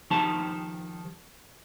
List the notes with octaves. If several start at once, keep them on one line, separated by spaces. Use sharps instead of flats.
D#3 F3 D#4 G4 C5 A5